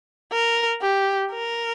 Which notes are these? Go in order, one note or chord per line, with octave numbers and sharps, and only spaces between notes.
A#4
G4
A#4